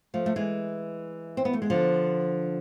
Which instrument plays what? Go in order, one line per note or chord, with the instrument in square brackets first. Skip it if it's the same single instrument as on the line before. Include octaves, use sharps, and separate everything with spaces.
[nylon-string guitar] F3 A3
A3
E3 G#3
C4
B3
A3
G#3
D3 F3